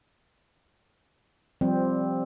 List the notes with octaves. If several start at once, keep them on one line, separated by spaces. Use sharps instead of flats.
F3 G3 C4